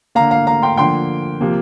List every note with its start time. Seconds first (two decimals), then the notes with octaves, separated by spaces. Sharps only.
0.15 D3 A#3 F5 A#5
0.31 F5 A#5
0.47 F5 A#5
0.62 G5 C6
0.78 D3 F3 A#3 G5 C6
1.41 C3 F3 A#3